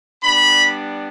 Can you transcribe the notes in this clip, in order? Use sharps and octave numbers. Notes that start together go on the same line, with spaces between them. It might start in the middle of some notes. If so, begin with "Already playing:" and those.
G3 B3 D4 B5